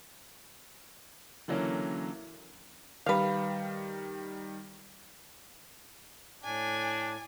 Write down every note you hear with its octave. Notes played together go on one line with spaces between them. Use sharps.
D3 E3 F#3 A#3 C#4
D#3 G3 B4 F5
A2 D4 G#5